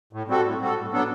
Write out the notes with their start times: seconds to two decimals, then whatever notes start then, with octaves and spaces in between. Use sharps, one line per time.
0.13 A2
0.28 G3 C4 F#4 A4
0.44 A2
0.60 G3 C4 F#4 A4
0.77 A2
0.92 F#3 B3 D4 A4